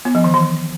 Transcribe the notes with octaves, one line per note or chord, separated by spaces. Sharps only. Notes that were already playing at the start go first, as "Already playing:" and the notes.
B3
F3
D#3
E3